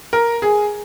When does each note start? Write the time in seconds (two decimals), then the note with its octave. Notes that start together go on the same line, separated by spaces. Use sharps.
0.13 A#4
0.42 G#4